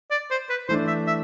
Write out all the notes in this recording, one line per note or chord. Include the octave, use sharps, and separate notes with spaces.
D5
C5
B4
E3 A3 D4 C5
E5
E5